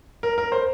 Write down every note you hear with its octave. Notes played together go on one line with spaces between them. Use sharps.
A#4
A#4
C5